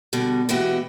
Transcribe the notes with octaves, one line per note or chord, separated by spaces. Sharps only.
B2 D3 G3
B2 E3 G#3 B3 F#4 G4